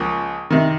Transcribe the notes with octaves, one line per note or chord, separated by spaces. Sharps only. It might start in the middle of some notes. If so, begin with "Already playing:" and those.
Already playing: C#2 F3 A#3
C3 D#3